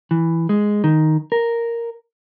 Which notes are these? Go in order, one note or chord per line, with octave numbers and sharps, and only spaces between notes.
E3
G#3
D#3
A#4